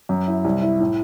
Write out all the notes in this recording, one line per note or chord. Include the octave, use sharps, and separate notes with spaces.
F#2
E4
C2
E4
A2